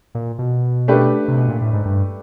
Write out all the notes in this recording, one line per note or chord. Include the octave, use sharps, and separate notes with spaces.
A#2
B2
A3 D4 G4 B4
C3
B2
A#2
A2
G#2
G2